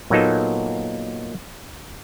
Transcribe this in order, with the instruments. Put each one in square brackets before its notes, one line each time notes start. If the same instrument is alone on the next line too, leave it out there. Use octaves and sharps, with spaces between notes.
[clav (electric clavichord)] A#2 F#3 A#3 B3 D#4 A4